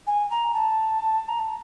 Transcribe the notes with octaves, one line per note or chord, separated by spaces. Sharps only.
G#5
A#5
A5
A#5
A5